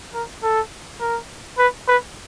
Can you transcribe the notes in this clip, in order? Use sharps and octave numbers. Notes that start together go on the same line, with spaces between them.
A#4
A4
A#4
B4
B4